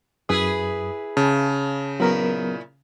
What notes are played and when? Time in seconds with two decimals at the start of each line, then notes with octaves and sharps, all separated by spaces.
0.29 F#2 E4 G#4 B4 D#6
1.17 C#3 A5
2.00 A#2 F#3 B3 E4 A#4